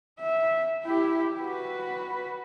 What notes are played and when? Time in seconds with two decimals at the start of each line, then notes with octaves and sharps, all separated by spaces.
0.20 E5
0.84 E4 G4
1.40 F#4 B4